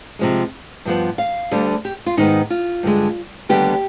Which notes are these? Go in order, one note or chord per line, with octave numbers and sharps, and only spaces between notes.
C3 F3 G#3
G2 F3 B3
F5
D2 D3 G3
G4
F4
G#2 D#3 B3 D#4
F4
G2 D3 G#3
D#2 D3 G3 B3 G4